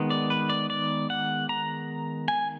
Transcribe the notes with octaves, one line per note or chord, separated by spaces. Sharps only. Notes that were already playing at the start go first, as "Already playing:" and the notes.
Already playing: D#3 G#3 B3
D5
B4
D5
D5
F#5
A#5
G#5